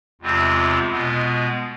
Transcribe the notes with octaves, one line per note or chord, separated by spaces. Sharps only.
E2 C3 G#3 C4 F4
B2 G#3 B3 F4